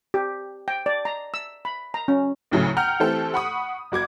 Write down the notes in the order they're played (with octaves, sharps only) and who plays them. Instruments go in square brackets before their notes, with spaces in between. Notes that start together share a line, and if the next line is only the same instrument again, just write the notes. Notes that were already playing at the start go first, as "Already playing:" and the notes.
[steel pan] G4
G5
D5
A#5
E6
B5
A#5
C#4
[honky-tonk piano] D2 A2 C#3 F#3 A3
F#5 G5 A#5 F6 G6
E3 A3 C4 G4 A4
F#5 B5 C#6 D#6
G1 F#4 D6 G#6